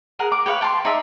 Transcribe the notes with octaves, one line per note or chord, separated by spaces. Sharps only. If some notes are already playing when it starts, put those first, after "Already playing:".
G#4 A#4 F#5
D6
G4 B4 C#5 F5
G5 A5 A#5 C6
D#4 D5 E5 A5